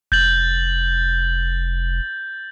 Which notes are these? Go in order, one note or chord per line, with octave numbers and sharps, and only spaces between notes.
F1 G6 A6 F#7